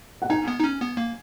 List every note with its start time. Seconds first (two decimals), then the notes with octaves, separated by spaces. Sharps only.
0.22 F#5
0.30 D#4 G#5
0.48 B3
0.60 D#4
0.64 C#4
0.80 B3
0.97 A#3